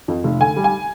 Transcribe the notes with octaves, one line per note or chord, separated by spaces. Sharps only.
F2
F1
D3 G#5
G3
G#5